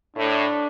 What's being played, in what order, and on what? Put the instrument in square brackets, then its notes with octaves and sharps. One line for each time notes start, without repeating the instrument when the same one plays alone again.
[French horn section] A2 [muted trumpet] D4